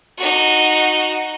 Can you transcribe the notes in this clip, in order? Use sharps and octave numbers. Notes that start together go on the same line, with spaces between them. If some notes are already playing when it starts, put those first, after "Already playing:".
D#4 F#4